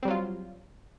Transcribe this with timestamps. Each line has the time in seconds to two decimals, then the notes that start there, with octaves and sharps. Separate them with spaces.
0.03 C4
0.05 G3
0.08 F#3
0.10 F4